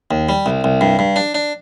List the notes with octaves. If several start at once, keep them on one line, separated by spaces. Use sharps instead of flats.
D#2
G3
C2
C2
G2
G2
D4
D4